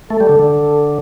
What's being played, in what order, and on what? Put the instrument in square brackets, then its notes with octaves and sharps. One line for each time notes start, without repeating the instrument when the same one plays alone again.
[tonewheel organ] A3 [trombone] A4
[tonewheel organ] G3
D3
D3